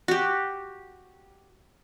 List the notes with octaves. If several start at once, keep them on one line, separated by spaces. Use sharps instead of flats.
F#4 G4